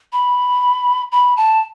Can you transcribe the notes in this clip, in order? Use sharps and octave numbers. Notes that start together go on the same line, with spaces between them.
B5
B5
A5